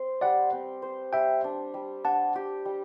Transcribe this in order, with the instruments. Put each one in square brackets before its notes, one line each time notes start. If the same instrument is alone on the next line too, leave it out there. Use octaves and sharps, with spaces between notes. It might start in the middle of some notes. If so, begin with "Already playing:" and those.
Already playing: [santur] C4 C5
[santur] G3 [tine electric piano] D5 F#5
[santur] C4
C5
[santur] G3 [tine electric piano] E5 G5
[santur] D4
G3
[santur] D4 [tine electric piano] F#5 A5
[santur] G4
G3